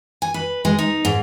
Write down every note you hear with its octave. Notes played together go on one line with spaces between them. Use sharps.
G#5
B4
G#3
D#4
G#2